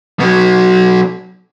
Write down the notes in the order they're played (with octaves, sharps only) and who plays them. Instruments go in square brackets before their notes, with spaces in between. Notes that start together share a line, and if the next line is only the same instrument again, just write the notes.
[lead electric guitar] B2 F#3